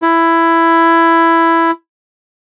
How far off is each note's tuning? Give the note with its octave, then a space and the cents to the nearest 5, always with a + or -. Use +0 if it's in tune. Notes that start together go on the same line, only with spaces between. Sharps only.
E4 +10